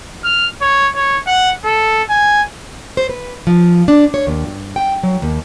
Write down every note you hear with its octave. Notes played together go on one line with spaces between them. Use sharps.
F6
C#5
C#5
F#5
A4
G#5
C5
B4
F3
D4
C#5
D#2
G2
G5
F#3
D#2